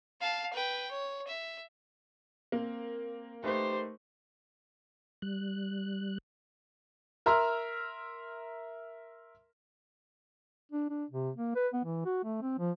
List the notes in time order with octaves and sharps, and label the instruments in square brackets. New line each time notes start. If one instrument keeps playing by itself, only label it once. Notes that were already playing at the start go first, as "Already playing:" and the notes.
[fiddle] F5 A5
B4 G5
C#5
E5
[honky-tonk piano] A#3 [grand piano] C4
[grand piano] A3 D#4 B4 [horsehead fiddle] G4 C5
[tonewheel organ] G3 F#6
[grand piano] A#4 E5 A#5 C6 E6 F6
[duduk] D4
D4
C3
A#3
B4
B3
E3
F#4
A3
C4
F3